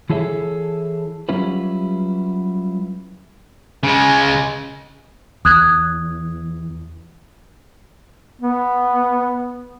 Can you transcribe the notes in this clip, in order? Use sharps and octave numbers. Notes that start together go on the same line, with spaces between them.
E3 E4 G#4 A4 C#5 E5
F#3 G3 C#4 E4 F4 B4
C#3 G#3
E2 D#6 F#6 G#6
B3